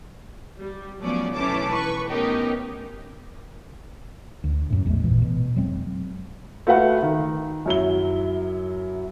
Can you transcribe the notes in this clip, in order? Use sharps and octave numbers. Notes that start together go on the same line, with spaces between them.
G3
F3 F#3 A3 B3 C#4 D5
B1 E3 A3 C#4 A5 D6
B4 C#6
A3 B3 C#4 D#4 G4 A#4
D2
F#2 A2
A#1 E2 G#3 A3
G#1 A#2 E3
B2
F1 F#3 G#3 C4
A3 F4 F#4 B4 F5 F#5
D#3
F#2 F#3 E4 G7